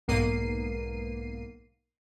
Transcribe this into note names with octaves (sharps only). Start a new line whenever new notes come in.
B1 G#2 A#3 B3 C7 D#7